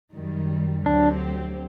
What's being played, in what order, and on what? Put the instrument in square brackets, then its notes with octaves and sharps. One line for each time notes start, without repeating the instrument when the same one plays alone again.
[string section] F#2 D#3 G3
[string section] D2 D3 F#3 C4 G4 [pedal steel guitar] D4